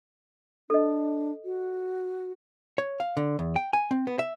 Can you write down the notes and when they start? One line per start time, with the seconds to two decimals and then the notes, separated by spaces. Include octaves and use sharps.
0.70 D4 A4 D#5
1.45 F#4
2.78 C#5
3.00 F5
3.17 D3
3.39 E2
3.56 G5
3.73 G#5
3.91 C4
4.07 B3
4.19 E5